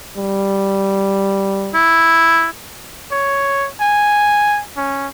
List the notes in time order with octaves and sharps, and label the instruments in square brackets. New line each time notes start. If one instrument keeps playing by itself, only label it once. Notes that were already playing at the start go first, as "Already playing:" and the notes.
[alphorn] G3
[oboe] E4
[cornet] C#5
G#5
C#4